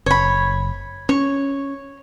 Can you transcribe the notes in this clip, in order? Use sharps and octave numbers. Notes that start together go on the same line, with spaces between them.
F#1 C#5 B5
C#4 C#5